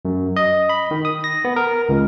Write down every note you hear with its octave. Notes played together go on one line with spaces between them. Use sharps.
F#2
D#5
B5
D#3
D#6
A#6
B3
A#4
C#2